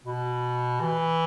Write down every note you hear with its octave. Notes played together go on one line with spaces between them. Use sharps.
B2
E3